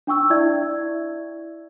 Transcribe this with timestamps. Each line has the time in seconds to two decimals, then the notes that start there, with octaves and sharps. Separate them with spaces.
0.07 D4 G5 C#6 E6
0.30 E4 D5 E5 G#6